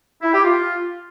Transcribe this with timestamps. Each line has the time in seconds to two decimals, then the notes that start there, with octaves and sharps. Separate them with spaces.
0.22 E4
0.33 G4
0.44 F4